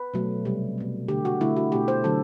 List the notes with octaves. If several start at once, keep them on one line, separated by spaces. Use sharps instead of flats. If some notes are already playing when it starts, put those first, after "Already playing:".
Already playing: B4
B2 F#3 A3
C3 G3
B2 A3
D3 A3 G4
F#4
D3 A3 E4
F#4
B2 A3 G4
C5
D3 F#3 A3 A4